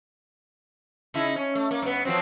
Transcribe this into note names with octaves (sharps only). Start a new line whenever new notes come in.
C#3 D#4 E4
C#4
A3
A#3
G2 B3
F3 F#3 C4